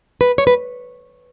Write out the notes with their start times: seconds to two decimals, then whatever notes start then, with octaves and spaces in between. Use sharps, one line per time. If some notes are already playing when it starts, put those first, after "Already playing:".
0.21 B4
0.38 C#5
0.47 B4